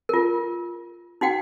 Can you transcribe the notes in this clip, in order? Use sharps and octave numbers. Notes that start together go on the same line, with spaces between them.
F4 A#4
D#4 F#4 F#5 G5